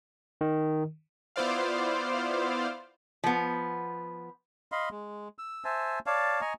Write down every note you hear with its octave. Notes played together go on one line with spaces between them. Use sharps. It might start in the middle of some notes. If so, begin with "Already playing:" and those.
D#3
B3 E4 F4 C5 D5 F5
F3 B3
D#5 F5 B5 C6
G#3
E6
C5 E5 G#5 A5
C#5 D5 F5 A5
D#5 G#5 A#5 C#6